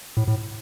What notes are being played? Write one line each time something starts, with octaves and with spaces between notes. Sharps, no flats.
A2
A2